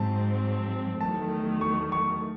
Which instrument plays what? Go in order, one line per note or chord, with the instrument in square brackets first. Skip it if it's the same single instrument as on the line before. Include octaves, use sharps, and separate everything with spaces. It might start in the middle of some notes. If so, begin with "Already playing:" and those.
Already playing: [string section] G#2 F#3 C4 [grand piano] A5
[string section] E2 D#3 F#3 A3 [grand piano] A5
[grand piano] C#6
C#6